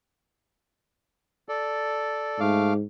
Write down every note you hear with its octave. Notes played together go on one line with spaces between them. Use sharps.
A4 D5
G#2 A3 F5 D6